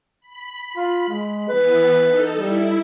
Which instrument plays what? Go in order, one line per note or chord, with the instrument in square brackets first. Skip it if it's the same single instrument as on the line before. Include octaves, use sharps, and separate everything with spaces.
[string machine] B5
[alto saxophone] F4
G#3
[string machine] E3 B3 [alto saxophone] B4
[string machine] D#4 A4
[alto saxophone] G3 [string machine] E4